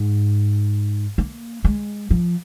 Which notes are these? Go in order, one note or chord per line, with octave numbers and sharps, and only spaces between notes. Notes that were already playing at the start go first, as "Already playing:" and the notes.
Already playing: G#2
A#3
G#3
F3